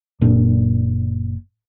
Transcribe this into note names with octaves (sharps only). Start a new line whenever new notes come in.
F#1 A#2 D4